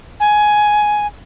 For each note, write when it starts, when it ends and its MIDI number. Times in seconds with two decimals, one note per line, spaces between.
0.20 1.07 80